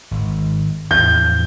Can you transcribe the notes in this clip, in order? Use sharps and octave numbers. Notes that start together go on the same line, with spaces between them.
G#1
E2 A2 F3 G6